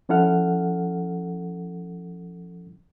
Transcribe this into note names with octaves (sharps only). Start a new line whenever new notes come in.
F3 C#4 E4 A4 F#5 F6